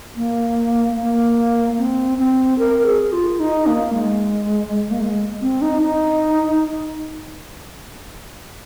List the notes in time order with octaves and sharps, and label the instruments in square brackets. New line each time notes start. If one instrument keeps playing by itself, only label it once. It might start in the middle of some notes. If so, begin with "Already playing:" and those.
[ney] A#3
A#3
C4
C4
A#4
G#4
F4
D#4
A#3
G#3
A#3
G#3
C4
D#4
D#4